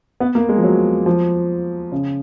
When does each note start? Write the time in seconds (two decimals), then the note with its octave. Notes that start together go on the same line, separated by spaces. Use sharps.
0.20 B3
0.35 A#3
0.49 G#3
0.57 F3
0.64 F#3
1.06 F3
1.92 C#3